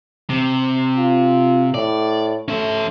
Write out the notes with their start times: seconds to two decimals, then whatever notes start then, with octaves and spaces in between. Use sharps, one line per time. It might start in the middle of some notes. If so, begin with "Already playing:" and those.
0.30 C3
0.97 F4
1.74 A2 D5
2.48 A3 C#4 E5